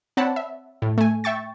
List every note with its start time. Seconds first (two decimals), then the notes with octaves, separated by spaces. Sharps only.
0.17 C4 C#5 D5 F#5 A5 B5
0.36 E5
0.82 A2
0.98 A3 G#5
1.24 E5 G5 C#6 A6